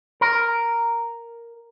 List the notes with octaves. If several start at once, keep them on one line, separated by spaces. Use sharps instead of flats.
A#4